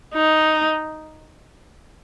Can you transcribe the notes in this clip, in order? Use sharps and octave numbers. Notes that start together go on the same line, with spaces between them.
D#4